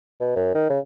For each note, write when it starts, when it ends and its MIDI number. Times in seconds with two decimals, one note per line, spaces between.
0.20 0.34 47
0.36 0.52 42
0.55 0.66 51
0.70 0.79 49